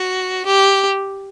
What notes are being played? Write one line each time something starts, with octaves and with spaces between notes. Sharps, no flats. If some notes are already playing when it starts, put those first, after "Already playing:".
Already playing: F#4
G4